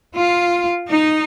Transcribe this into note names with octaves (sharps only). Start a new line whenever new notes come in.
F4
D#4